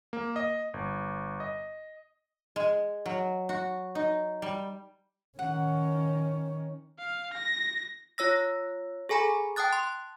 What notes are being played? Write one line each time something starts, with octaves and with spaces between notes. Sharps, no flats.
A#3
D#5
G1
D#5
G#3
F#3
F#4
D#4
G3
D#3 C#4 F#5
F5
A#6
F4 C#5 E6 A#6
G#4 A4 G#5 A#5 B5
G5 A5 D#6 F#6 A6
C6